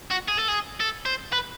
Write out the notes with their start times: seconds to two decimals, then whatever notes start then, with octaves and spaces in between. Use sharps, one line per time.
0.11 F#4
0.29 G#4
0.39 A4
0.49 G#4
0.80 A4
1.06 C5
1.33 B4